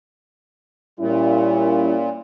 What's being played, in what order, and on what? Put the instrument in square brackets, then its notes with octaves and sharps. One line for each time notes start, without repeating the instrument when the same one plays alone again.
[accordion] A#2 [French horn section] G3 C#4 E4